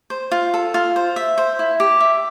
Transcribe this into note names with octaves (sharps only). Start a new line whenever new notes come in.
C5
F4
A4
F4
C5
E5
C5
E4
G4
E5